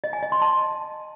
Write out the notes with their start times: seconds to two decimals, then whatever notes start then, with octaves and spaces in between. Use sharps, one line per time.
0.04 D#5
0.13 G#5
0.23 D#5
0.32 C6
0.42 A5